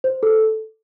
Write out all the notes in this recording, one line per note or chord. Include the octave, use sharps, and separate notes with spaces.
C5
A4